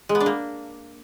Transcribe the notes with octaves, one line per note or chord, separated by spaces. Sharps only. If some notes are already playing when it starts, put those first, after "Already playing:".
G#3
B3
D4
A#3